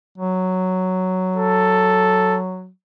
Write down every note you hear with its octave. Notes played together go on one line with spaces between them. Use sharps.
F#3
A4